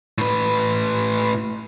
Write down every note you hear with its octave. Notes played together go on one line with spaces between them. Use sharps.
A2 B4